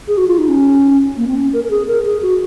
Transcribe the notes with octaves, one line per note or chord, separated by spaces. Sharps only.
G#4
F#4
F4
D#4
C#4
A#3
C4
C#4
A#4
A#4
G#4
A#4
G#4
F#4